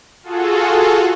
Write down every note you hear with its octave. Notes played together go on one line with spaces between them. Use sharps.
F4 F#4 G#4 A4